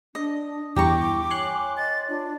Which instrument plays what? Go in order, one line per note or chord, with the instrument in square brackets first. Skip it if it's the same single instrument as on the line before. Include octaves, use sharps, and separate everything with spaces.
[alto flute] D4 [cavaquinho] D#5
[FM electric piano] E2 G2 G3 [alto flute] E4 [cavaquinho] G4 A#5 C#6 [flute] D6
[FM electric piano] C#5 C6 F#6 [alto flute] G#5
[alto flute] D#5 [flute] A6
[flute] D4 [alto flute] F4